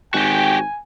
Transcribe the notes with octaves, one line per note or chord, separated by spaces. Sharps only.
G#1 F#4 G4 G5 G#5